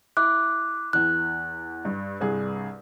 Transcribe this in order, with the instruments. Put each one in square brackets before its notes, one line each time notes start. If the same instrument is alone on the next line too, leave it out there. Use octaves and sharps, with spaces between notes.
[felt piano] E4 [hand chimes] D6 F#6
[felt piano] E2 E3 [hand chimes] F#6
[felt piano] G2
C2 G2 G#4